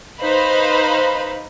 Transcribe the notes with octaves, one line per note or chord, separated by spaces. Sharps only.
D#4 B4 C5 F5 B5